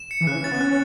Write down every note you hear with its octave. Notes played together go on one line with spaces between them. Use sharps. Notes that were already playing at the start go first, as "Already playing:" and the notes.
Already playing: E7
C#7
E3
C#3 F#6
E3
C#4 A6
B3
C#4 F#6